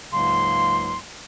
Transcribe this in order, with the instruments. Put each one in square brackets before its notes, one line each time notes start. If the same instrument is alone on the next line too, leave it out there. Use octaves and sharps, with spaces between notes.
[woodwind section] C#2 G#2 C#3 F#3 A#3 C6